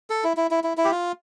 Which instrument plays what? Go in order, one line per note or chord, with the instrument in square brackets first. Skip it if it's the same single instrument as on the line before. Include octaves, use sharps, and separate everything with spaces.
[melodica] A4
E4
E4
E4
E4
E4
G4
F4